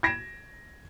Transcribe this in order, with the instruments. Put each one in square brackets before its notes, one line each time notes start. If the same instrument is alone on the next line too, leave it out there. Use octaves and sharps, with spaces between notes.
[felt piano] G#6 A#6 D7 E7